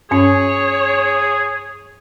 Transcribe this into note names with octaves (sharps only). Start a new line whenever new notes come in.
G2 C#4 G#4 C#5